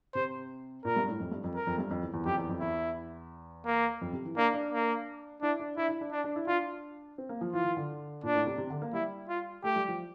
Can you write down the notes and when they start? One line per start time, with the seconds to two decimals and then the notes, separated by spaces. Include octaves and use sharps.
0.14 C3 C5
0.85 A#2 A#4
0.96 G2
1.08 A2
1.20 F2
1.32 G2
1.44 F2
1.55 A#4
1.67 F2
1.78 G2
1.91 F2
2.02 E2
2.14 E2
2.26 F2 G4
2.37 E2
2.49 F2
2.60 E2 E4
3.66 A#3
4.01 F2
4.13 C3
4.25 E3
4.37 A#3 D4
4.54 D4
4.72 A#3
5.42 D4 E4
5.60 D4
5.77 D4 E4
5.89 E4
6.01 D4
6.12 D4
6.24 D4
6.36 E4
6.47 D4 F4
7.18 C4
7.29 A#3
7.41 F3
7.53 E3 F4
7.65 E3
7.77 D3
8.23 A#2 D4
8.35 A2
8.46 C3
8.58 C3
8.70 D3
8.82 A#3
8.93 G3 E4
9.29 F4
9.64 A3 G4
9.76 G3
9.88 F3